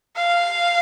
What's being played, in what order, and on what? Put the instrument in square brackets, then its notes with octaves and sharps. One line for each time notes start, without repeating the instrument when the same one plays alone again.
[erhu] F5